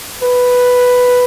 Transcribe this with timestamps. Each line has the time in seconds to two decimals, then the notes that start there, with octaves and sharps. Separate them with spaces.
0.23 B4